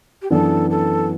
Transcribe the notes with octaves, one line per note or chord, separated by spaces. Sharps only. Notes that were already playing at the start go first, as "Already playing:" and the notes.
G4
F#2 E3 B3 D4 A4
A4